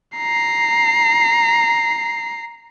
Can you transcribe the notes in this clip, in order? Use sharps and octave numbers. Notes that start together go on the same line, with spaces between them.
A#5 C7